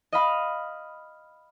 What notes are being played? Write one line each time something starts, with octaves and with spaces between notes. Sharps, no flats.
D#5 F5 B5 F6